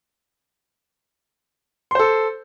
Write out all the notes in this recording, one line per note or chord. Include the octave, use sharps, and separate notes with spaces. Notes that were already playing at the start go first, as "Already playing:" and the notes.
A4 C5 C6